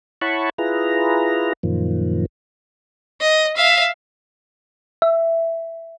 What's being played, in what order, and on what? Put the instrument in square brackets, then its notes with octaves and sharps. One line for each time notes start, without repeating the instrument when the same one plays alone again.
[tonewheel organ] E4 C#5 F#5 A5 B5 C#6
E4 F4 G#4 B4 A#5
F#2 A#2 D#3 F3
[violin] D#5
E5 F5
[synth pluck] E5